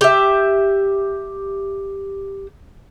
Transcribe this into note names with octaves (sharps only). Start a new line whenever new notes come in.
G4 E5